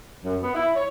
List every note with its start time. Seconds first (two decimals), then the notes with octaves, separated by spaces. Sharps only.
0.24 F#2
0.42 B3
0.55 E4
0.75 C#5